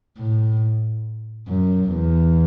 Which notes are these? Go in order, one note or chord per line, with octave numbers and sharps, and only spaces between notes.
A2
F#2
E2